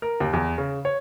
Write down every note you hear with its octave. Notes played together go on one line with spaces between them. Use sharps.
A#4
D#2
E2
C#3
C#5